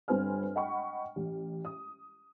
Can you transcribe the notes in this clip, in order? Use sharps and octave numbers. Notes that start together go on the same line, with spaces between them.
G1 C4 B4 G#5 F6
D#5 F#5 G5 B5 C#6
A1
D#6